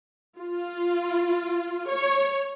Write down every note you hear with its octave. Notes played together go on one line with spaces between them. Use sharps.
F4
C#5